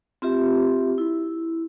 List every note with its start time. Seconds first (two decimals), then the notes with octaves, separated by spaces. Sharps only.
0.22 C4 F4 G4 E5
0.98 E4